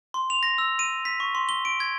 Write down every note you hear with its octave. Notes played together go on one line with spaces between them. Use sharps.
C6
F7
A#6
E6
D#7
B6
C#6
C6
G7
D7
G#6